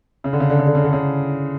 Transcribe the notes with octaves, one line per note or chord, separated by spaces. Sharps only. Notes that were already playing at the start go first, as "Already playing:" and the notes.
C#3
D3
C#3
D3
C#3
D3
C#3
D3
C#3